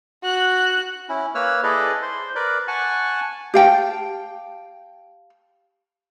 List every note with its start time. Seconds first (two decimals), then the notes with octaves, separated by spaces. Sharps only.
0.23 F#4 F#6
1.09 C#4 E4
1.35 A#3 B4 C#5 E6 F6
1.63 E4 G#4 A4 B4 D5 D#5
2.02 C5 C6
2.35 A#4 B4 D5
2.68 F#5 G#5 A5 C#6
3.54 G4 F5 G5 A5